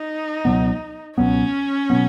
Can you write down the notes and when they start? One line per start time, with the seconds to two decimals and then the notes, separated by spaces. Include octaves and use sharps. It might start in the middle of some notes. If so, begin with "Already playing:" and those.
Already playing: D#4
0.45 C#2 B2 F#3 B3
1.17 C#2 B2 F#3 B3 C#4
1.90 B2 F#3 B3